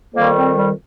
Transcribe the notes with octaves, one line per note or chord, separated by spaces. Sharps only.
F2 D#3 G3 A#3
C4
G3